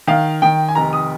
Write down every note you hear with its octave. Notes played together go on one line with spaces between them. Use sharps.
D#3 F5
D#3 G5
G#5
F1 A#5
D#6